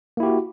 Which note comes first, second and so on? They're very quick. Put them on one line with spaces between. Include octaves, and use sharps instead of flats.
A#3 E4 G4 F#4